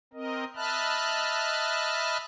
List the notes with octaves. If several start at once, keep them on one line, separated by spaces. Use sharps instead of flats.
C4 A#4 D#5
D#5 E5 A5 B5 F6 F#6